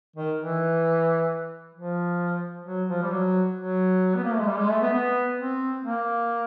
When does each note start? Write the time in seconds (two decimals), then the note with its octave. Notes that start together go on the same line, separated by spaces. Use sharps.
0.16 D#3
0.39 E3
1.75 F3
2.66 F#3
2.89 F3
3.02 G3
3.11 F#3
3.57 F#3
4.16 B3
4.24 A#3
4.32 A3
4.40 G#3
4.48 G3
4.59 G#3
4.70 A3
4.81 B3
4.93 B3
5.38 C4
5.84 A#3